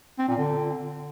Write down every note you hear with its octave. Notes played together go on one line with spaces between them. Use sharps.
C4
A#2
D3